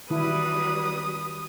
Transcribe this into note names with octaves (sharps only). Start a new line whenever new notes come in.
D#3 E3 F#3 G3 E4 B4 D#6